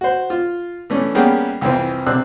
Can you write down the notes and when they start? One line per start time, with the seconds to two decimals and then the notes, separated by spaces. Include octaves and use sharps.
0.01 F#4 C5
0.30 F4
0.90 E3 A3 C#4 D4
1.15 G3 A#3 B3 C#4 G#4 G5
1.61 C2 F2 E3 C4
2.07 C3 C4 D4 E6 F#6